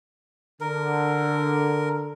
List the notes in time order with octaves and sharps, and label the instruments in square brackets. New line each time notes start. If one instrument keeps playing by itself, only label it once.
[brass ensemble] D3 [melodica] A#4